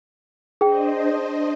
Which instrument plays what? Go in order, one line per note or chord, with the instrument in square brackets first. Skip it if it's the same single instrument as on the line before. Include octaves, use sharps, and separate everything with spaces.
[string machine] D4 C5 D#5 [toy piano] G#4 G5